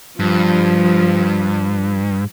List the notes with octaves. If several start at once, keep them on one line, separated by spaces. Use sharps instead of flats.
G2 F3